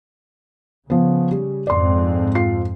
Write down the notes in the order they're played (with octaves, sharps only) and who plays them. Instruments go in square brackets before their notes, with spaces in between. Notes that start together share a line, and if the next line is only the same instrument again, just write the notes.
[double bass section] C#3 [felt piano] F3 B3
[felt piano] G3
[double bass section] F2 G#2 C4 [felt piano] D5 C6
[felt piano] F4 C7